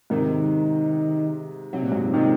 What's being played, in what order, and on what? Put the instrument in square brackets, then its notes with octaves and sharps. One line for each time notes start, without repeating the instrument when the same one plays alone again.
[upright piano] G#2 C3 [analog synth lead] D#3
[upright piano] C3 [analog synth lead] F#3
[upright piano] A#2
G#2 C3
[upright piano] C3 D#3 [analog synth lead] G#3